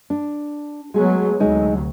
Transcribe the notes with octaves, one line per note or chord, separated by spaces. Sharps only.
D4
F#3 G#3 A3 B3 G#4
D2 C3 F#3 G#3 D#4 D#5